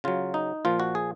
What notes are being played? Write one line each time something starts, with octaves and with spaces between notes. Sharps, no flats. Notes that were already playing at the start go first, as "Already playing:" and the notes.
C#3 F#3 F4
D#4
A#2 F3 F4
F#4
G#4